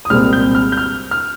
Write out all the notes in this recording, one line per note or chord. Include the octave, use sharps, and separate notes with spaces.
D#6
C2 A#2 G#3 C4 F6
G6
F6
G6
F6
F6